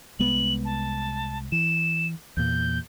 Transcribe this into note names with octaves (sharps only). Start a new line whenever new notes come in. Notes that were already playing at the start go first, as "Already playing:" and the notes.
C2 G#3 B3 F#7
A5
E3 E7
E2 A#2 G6